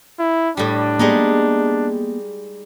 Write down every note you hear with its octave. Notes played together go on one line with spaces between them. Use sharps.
E4
A2 G3 D4
G3 G#3 A#3 B3 D#4